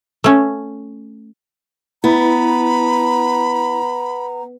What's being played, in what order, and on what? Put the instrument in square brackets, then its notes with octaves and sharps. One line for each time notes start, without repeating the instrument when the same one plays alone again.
[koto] A3 C#4
[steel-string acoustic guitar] B3 [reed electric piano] E4 [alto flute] A#5 [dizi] B5